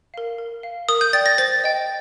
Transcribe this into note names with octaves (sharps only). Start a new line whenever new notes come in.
A#4 F5
A#4
F5
A#4 D#6
G6
D5 G5 A6
A#6
C5 A6
D#5 G5